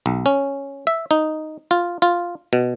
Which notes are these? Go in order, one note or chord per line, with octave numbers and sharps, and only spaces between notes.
B1
C#4
E5
D#4
F4
F4
B2